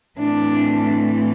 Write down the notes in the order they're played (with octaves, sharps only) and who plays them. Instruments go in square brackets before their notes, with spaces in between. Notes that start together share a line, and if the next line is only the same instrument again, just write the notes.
[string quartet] A2 E3 A3 C4 D4